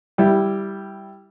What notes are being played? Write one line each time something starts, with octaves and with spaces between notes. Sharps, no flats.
G3 E4